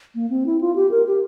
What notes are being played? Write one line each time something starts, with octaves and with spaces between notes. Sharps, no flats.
A#3
C4
E4
F4
G4
A#4
G4